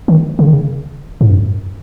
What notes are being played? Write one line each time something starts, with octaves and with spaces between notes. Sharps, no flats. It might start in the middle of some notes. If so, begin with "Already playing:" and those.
D#3
C#3
D#3
C#3
G#2
F#2